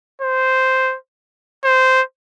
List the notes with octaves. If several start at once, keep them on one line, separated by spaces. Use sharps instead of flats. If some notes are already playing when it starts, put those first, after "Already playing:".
C5
C5